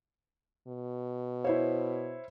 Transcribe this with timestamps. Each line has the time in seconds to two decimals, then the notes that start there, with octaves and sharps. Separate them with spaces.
0.68 B2
1.45 E4 C5 C#5